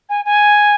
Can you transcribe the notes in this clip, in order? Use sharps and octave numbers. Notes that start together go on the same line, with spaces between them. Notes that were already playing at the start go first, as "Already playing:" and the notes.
G#5
G#5